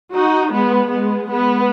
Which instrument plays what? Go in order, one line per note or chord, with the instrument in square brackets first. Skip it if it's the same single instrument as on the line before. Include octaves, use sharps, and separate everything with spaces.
[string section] D#4 F#4
G#3 B3
G#3 B3
G#3 B3